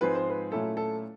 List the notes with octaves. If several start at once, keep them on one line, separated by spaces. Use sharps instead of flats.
G#2 F3 G#3 C4 B4
C5
B4
A#2 F#3 A3 C#4 E4 A4
A4